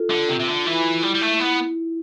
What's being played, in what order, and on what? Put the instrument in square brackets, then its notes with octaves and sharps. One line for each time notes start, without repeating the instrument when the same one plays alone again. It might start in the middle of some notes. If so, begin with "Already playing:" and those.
Already playing: [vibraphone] F4 A4
[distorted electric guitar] D3
C3
C3
D3
[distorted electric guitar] E3 [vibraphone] E4
[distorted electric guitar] G3
G3
A3
[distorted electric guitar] B3 [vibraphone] E4